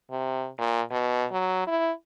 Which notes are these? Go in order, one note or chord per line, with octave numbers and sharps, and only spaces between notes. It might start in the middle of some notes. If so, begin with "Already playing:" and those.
C3
A#2
B2
F#3
E4